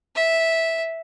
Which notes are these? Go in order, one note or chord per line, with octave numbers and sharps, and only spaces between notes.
E5